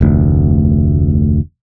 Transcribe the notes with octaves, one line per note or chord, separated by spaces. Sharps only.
F1 D2